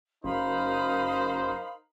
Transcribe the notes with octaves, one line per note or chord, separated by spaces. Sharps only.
F#1 F#2 D#4 A#4 C5 F5 B5 D#6